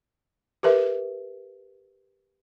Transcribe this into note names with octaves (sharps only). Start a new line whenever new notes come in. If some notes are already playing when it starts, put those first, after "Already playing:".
G4 A#4 B4 E5